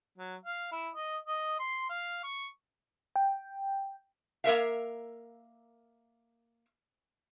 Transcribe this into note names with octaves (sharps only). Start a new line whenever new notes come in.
F#3
F5
E4
D#5
D#5
C6
F5
C#6
G5
A#3 A#4 E5 F5